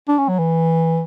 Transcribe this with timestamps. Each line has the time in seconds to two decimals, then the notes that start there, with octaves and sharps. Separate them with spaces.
0.08 D4
0.18 C#4
0.28 F#3
0.39 E3